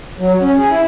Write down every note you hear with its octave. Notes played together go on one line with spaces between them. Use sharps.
F#3
C#4
G#4
E4